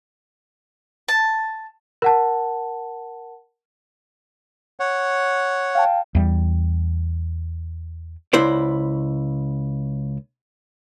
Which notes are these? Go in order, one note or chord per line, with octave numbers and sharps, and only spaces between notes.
A5
A#4 F#5 A5
C#5 F#5
F5 G5 A5
E2 G3
C#2 E4 C5 D5